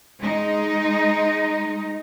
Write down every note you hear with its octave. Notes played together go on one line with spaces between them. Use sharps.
G#3 D#4